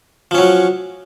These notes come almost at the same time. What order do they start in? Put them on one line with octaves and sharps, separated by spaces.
F3 C#4 F#3